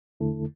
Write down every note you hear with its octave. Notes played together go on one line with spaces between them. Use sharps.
E2 D3 A3 E4 A4